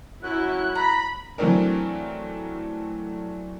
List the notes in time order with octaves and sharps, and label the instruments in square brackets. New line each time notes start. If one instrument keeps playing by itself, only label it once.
[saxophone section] F#2 F#3 [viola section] E4 [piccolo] F#6
[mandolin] A#5 [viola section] B5
[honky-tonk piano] E3 F#3 A3 C4 D4 A#4